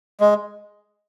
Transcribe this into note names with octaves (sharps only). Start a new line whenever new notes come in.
G#3